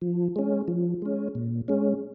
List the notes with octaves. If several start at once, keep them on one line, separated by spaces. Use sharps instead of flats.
F3
G#3 C#4
F3
G#3 C#4
A#2
G#3 C#4